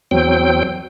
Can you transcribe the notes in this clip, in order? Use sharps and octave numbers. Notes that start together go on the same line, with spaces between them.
E2 F#3 C4 G5